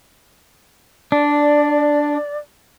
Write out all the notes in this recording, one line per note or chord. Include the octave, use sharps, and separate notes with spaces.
D4 D5